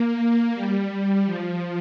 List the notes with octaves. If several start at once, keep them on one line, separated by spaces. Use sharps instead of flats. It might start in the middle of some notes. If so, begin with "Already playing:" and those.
Already playing: A#3
G3
G3
F3